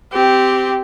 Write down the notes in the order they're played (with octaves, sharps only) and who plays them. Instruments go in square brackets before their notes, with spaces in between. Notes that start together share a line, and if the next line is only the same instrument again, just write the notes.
[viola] C4 G4